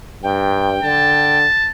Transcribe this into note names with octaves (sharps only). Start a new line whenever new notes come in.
G2 G5
D3 A5